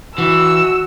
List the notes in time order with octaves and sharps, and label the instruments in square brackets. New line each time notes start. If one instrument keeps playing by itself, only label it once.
[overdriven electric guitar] E3 [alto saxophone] F#4 [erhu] E6